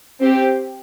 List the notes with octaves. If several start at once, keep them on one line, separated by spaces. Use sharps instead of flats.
C4 G4